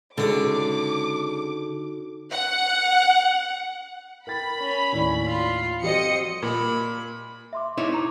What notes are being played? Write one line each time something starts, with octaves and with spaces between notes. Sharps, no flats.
C#2 D3 C#4 D#4 F#4 D6
F#5
A#4 G5 B5 A6
C#4
D#2 A2 D5
F4
F3 G3 C4 F#4 D#5 C#7
A#2 B5
E5 C6 D6
D#4 E4 C#5
A#5 D6